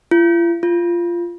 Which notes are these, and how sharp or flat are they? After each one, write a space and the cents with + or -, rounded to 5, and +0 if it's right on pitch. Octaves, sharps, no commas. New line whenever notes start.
F4 -45
F4 -15